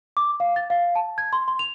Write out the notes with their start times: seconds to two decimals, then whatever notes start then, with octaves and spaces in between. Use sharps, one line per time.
0.17 D6
0.40 F5
0.56 A6
0.70 F5
0.95 A5
1.18 G#6
1.33 C6
1.48 C6
1.59 F7